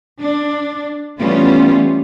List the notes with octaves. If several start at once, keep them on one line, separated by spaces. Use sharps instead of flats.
D4
E3 G3 A3 B3 C#4 F4